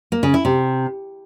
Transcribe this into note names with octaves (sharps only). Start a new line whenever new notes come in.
A#3
C#3
E4
C3